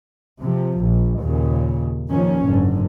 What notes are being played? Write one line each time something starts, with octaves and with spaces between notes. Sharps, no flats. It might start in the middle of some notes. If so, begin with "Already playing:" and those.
C3 F3
A#1
D#2 A#2 C#3
D#2 A#2 F3 C#4
F#1 G#2 D3